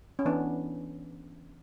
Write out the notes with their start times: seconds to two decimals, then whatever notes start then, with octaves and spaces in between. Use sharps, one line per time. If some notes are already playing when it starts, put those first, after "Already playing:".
0.19 C#4
0.25 E3 B3 D4